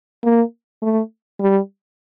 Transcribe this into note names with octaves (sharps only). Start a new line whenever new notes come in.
A#3
A3
G3